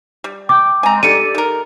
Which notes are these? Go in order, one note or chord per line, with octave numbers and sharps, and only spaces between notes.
G3
G5 D6
G#3 C4 G#5 A#5
D3 G3 D#4 G4 A4 D5 C#7 D#7
D#3 A#4